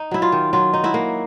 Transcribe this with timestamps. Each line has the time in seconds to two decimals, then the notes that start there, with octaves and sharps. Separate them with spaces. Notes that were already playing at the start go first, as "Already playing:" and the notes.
Already playing: D#4
0.11 F#3 E4
0.22 F4
0.32 D#3
0.53 F#3 F4
0.74 D#4
0.84 E4 F#4
0.94 A#3